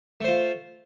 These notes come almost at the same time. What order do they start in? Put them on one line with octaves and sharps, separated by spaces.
A3 C5 F4